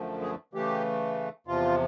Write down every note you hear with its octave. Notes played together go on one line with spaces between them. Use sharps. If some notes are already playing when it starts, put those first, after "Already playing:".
Already playing: F#2 D3 F3 A3
G#4
C#3 E3 A3 G4
E2 C3 F3 F4